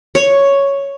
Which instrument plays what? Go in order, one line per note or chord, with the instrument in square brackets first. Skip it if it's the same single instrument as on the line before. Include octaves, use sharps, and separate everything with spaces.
[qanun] C#5